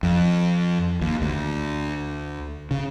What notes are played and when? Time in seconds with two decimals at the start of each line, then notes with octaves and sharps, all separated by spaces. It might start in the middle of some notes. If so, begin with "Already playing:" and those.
0.03 F2
1.01 D#2
1.22 D2
2.71 C#3